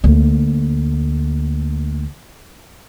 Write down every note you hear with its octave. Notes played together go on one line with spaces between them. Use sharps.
D2 A#3